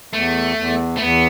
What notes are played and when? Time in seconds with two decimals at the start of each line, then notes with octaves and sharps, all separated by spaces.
0.13 E2 A3
0.57 E2
0.97 A3
1.01 E2 B3